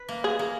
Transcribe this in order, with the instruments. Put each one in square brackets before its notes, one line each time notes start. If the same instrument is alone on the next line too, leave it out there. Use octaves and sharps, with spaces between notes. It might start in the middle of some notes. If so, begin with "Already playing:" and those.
Already playing: [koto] B4
A#3
[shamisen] G#4
[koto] A#3